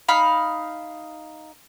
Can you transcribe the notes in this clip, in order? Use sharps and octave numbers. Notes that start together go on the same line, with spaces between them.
D#4 F5 B5